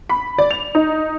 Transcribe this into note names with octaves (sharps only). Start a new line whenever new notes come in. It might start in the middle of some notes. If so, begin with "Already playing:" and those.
B5
D5
F7
D#4